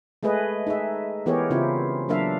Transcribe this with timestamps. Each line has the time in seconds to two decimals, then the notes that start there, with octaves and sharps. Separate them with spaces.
0.23 G#3 A3 G#4 B4 D#5
0.67 D#4 G#4 E5
1.26 E3 B3 G4 G#4 A#4 C#5
1.50 C#3 C4 E4 F4
2.09 F#3 A#3 D4 A#4 E5 F5